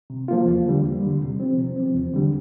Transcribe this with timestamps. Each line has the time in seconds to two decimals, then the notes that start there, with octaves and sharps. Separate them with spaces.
0.10 C3
0.28 F3 A#3 F4
0.47 E2
0.66 D3 G3
0.84 E2
1.03 D3 G3
1.21 C3
1.40 F3 C4
1.58 C3
1.77 F3 C4
1.95 E2
2.14 D3 G3